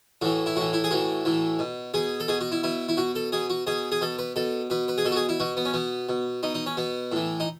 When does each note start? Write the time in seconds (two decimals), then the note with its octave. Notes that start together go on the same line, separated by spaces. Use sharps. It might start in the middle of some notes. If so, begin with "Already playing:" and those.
0.22 A2 E3 F#4
0.46 E4
0.56 A2 E3 F#4
0.73 E4
0.84 G#4
0.91 A2 E3 F#4
1.25 A2 E3
1.59 B2
1.94 B2 G#4
2.20 A4
2.28 B2 G#4
2.41 F#4
2.52 E4
2.63 B2 E4
2.89 E4
2.97 B2 F#4
3.15 A4
3.32 B2 G#4
3.50 F#4
3.67 B2 G#4
3.92 G#4
4.01 B2 A4
4.19 B4
4.36 B2 A4
4.70 B2 B4
4.88 B4
4.98 G#4
5.05 B2 A4
5.12 F#4
5.16 G#4
5.29 E4
5.40 B2 F#4
5.57 B3
5.65 C#4
5.74 B2 B3
6.09 B2
6.43 B2 D#4
6.55 D#4
6.66 C#4
6.77 B2 B3
7.12 A2 E3
7.40 D#4